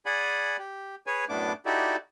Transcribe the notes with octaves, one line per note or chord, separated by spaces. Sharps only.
G#4 D5 F#5 G#5 B5
G4
G#4 B4 C#5 G#5
F#2 A2 A3 B3 D4 D6
D#4 E4 F#4 G4 A4 D5